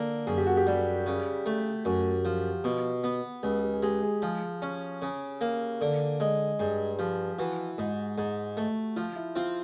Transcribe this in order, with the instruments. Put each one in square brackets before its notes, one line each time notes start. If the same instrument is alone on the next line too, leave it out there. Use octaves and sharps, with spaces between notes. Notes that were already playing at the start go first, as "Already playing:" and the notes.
Already playing: [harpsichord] D3 A#3 [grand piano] A4
[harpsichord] F#2 [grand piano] G#4
[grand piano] G4
F#4
G4
[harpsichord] G3
C#3
A3
[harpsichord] F#2 [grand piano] F#4
[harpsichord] F3
B2
B3
[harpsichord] C#2 [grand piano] G4
[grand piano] G4
G#4
[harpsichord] G#3 [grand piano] G4
[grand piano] G#4
[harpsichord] F3 [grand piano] G#4
[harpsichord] C#4
C#3
A#3
D3
G#3
[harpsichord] G2 [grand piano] G#4
[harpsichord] F3 [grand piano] G4
[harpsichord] E3 [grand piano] F#4
[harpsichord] G#2
G#2
A3
[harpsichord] F3 [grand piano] F4
[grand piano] E4
[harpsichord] C4 [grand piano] F4